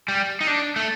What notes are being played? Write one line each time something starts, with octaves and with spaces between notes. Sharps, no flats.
G3
D#4
D4
A3